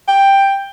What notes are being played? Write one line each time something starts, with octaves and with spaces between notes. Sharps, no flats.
G5